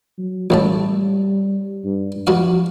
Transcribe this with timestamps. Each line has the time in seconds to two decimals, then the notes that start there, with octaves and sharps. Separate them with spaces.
0.18 F#3
0.50 A1 A2 G3 A5
1.84 G2
2.27 G2 F3 F#4 F5